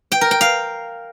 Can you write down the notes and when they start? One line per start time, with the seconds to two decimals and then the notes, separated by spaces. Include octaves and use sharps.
0.12 G5
0.21 A#4
0.31 G5
0.41 F5